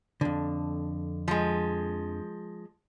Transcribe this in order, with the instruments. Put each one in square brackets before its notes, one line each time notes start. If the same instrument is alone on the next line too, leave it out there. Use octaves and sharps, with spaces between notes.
[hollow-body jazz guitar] F2 D3
[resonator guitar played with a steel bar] F3 G#3